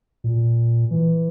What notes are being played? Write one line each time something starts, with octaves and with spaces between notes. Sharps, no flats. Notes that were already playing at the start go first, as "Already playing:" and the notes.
A#2
E3